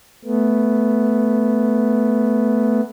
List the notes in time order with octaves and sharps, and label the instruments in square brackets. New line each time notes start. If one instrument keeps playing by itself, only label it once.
[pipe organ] A3 B3